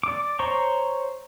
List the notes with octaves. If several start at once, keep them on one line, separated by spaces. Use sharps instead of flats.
D5 D6
C5 C#5 A#5 C6 C#6